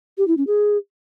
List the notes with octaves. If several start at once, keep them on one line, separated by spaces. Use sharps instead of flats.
G4
E4
C#4
G#4